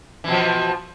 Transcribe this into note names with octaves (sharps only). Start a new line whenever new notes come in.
B2 E3 F3